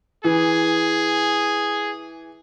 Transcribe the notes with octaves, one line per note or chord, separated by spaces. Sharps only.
E3 G#4